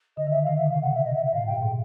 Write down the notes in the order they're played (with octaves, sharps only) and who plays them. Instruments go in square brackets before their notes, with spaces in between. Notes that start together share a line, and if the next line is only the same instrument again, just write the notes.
[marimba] D3 [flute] D#5
[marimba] D#3 [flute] E5
[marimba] D3
[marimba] D#3 [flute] F5
[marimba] D3 [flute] E5
[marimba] C#3 [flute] F5
[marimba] C3
[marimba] B2 [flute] F#5
[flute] E5
D#5
E5
E5
[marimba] A2 [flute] F5
[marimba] G#2 [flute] G5
[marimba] A#2
B2